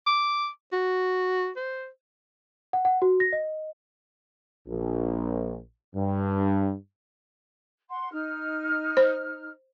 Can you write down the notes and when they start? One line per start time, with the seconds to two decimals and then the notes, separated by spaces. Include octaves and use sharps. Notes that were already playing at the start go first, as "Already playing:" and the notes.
0.07 D6
0.73 F#4
1.57 C5
2.73 F#5
2.85 F#5
3.02 F#4
3.20 A#6
3.33 D#5
4.68 A#1
5.94 G2
7.89 F#5 C6
8.12 D#4 F6
8.97 C5